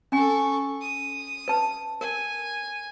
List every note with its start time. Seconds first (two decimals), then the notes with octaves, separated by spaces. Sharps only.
0.12 C#4 A4 G#5 C#6
0.81 D#6
1.48 B4 A5
2.01 A#4 G#5